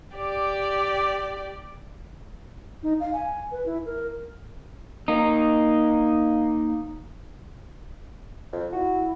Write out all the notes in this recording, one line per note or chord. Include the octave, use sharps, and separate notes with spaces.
G4 D5
D#4
F5
G#5
B4
E4
A#4
A#3 D#4
F2
E4 F#4